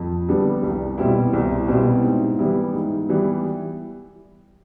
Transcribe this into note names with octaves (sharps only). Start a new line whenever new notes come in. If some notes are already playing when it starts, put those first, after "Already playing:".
Already playing: F2
D3 G3 B3 D4
C2
B2 G3 C4 E4
C2
B2 G3 C4 E4
G#2
E3 G3 B3 E4
G#2
E3 G3 B3 E4